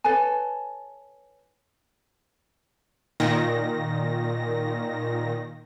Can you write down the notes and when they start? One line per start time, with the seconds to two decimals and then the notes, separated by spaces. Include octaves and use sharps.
0.04 A4 B4 C#5 G#5
3.20 A#2 D#3 A#6